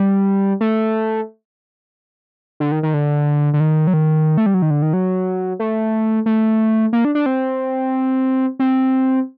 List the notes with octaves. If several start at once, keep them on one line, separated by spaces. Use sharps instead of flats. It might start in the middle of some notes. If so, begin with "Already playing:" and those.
Already playing: G3
A3
D3
D#3
D#3
D3
D3
D#3
F#3
D#3
A3
G3
F#3
D#3
D3
D#3
F#3
A3
A3
A#3
D4
D4
C4
C4